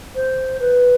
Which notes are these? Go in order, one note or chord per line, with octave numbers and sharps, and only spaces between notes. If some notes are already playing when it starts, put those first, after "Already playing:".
C5
B4